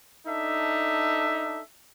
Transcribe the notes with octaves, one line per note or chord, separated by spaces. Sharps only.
D4 D#4 A4 E5